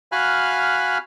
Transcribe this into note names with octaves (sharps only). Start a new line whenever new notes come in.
F#4 F5 G#5 B5 F6 F#6